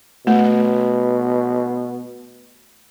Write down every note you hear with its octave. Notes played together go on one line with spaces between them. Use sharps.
B2 A3